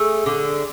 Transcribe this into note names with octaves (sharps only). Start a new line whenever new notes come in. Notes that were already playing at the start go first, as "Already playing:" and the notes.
Already playing: A3 G#4
D3